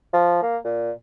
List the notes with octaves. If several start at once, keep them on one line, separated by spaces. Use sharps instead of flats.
F3
A#3
A#2